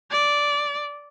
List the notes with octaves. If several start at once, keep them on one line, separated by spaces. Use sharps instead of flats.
D5